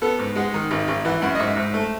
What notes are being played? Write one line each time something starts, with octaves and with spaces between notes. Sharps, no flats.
B3 A4
G#2
G#3 F#5
D#3
G#1
G#1
E3 F#5
F#2 F#5
D#5
G#2 E5
G#2
A3